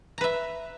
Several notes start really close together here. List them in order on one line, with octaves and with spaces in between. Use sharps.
A#5 B4 E5